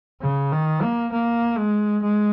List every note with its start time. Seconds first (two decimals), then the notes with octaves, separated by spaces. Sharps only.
0.21 C#3
0.52 D#3
0.82 A#3
1.12 A#3
1.57 G#3
2.03 G#3